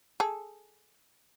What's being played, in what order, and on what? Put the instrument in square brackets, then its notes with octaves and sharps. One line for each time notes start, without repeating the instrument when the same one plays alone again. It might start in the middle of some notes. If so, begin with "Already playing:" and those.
[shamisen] G#4 A4